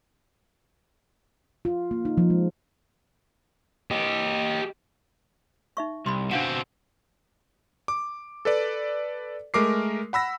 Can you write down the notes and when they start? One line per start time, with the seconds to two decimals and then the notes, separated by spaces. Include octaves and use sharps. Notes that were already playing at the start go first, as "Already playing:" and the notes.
1.65 F4
1.91 A#3
2.05 D#4
2.18 F3
2.30 G#3
3.91 G4 D#5
5.77 D#4 E5 C#6
6.06 C2 B5 C6
6.31 B2 C4 D4 F5 F#5
7.88 D6
8.45 A4 B4 D5
9.54 G#3 A3 A#4 D6 C7
10.13 F#5 B5 E6 A#6